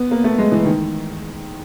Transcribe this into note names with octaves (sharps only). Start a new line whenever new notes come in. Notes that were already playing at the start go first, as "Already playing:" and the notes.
Already playing: B3
A#3
A3
G#3
E3
D#3